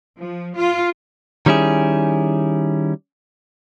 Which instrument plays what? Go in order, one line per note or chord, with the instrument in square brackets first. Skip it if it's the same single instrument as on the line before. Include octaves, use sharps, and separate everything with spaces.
[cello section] F3
F4
[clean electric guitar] D#3 G3 C#4 E4 G#4